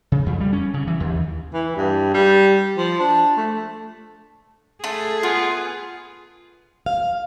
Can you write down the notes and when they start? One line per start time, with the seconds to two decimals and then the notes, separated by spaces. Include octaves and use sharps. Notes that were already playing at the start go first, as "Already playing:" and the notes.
0.12 C#3
0.26 F2
0.40 G3
0.53 C#4
0.74 C#3
0.87 E3
1.00 D#2
1.53 E3
1.76 G2
2.14 G3
2.77 F3
3.00 D4
3.37 A3
4.84 A3 G#4
5.23 B3 F4
6.86 F5